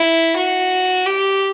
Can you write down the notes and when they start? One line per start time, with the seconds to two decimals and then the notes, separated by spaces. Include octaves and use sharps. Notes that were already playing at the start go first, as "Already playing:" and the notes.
Already playing: E4
0.36 F#4
1.06 G4